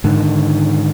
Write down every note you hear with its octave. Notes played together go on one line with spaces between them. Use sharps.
G#2 D3 D#3